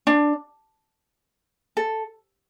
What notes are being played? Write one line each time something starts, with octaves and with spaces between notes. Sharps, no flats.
D4
A4